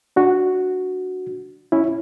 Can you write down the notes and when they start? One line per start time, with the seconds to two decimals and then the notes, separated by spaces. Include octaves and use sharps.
0.16 D4 F#4
1.72 C#4 E4